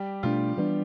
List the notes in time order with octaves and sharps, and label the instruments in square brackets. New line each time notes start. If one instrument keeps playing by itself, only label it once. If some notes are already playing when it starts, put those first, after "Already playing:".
Already playing: [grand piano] G3 G4
[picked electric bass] B2 A3 D4 [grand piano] F3 F4
[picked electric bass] E3 G3 B3 D4